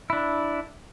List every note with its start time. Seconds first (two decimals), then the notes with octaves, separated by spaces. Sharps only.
0.10 D4 E4